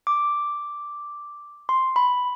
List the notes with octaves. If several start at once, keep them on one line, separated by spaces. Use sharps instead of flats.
D6
C6
B5